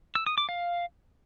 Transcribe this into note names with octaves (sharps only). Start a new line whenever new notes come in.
E6
D#6
D6
F5